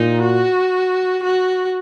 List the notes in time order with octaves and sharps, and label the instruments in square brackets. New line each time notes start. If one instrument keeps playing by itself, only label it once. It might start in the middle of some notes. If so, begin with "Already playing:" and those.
Already playing: [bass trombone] A#2 [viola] D#4
[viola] F#4
F#4